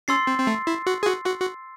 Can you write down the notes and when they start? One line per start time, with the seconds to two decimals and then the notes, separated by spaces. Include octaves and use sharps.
0.08 C#4 C6 E6 A6 C7
0.27 C4
0.39 C4
0.47 A3
0.67 E4
0.87 F#4
1.03 G#4
1.07 F#4
1.26 F#4
1.40 F#4